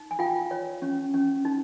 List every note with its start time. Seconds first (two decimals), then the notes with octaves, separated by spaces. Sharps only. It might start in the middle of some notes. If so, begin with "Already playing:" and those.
Already playing: D#4
0.11 G#5
0.19 F4 F5 G5
0.51 C#5
0.82 C#4
1.14 C#4
1.45 D#4